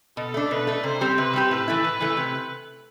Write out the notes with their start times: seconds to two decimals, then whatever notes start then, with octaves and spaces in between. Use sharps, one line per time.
0.17 B2 A4
0.34 A3 D4
0.51 B2 B4
0.67 A3 D4
0.84 C3 C5
1.01 G3 C4 G4
1.18 C3 B4
1.33 G3 C4 G4
1.51 A2 B4
1.68 E3 A3 E4
1.84 A2
2.00 E3 A3 E4
2.17 C3